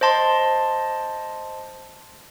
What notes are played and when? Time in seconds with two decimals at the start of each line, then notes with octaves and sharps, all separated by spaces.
0.01 C5 D#5 A5 C6